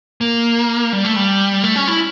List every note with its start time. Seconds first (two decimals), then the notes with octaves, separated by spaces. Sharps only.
0.21 A#3
0.93 G3
1.05 A3
1.16 G3
1.64 A3
1.76 C#4
1.88 E4